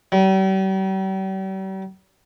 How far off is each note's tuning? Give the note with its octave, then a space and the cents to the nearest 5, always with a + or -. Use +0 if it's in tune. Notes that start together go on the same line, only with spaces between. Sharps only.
G3 -40